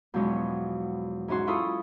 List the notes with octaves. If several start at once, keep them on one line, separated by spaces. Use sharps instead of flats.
E2 B2 F3 F#3 G#3 C#4
G#2 E3 C#4 F#4 C6
E4 F4 A4 B5 C#6 D#6